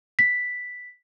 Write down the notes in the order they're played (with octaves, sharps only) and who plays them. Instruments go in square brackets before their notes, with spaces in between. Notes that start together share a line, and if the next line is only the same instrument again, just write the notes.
[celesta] B6